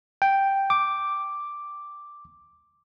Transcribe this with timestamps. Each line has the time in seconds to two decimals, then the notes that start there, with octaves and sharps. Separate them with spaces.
0.22 G5
0.70 D6